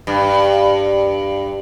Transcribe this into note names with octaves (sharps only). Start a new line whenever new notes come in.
G2